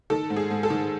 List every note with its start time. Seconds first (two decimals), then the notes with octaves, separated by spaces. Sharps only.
0.10 D#3 A4
0.30 G#2
0.36 G#4
0.50 G#2
0.63 A4
0.70 D#3